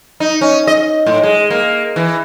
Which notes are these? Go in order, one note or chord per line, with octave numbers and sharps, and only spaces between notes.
D#4
C#4
D#5
A2
G#3
A#3
E3